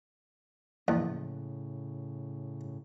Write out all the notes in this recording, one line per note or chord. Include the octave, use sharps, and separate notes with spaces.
A#1 E2 A2 C#3